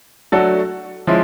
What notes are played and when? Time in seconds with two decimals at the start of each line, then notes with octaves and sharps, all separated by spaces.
0.32 F#3 A3 D4 F#4 A4
1.07 F3 G#3 C#4 E4